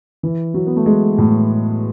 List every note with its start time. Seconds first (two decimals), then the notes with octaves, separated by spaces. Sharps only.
0.23 E3
0.54 F#3
0.67 B3
0.76 A3
0.86 G#3
1.18 A2